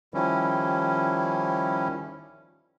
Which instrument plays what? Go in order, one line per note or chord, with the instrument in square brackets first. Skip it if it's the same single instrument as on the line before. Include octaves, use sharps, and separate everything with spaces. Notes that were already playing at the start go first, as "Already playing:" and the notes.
[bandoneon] D#3 F3 G3 C#4 E4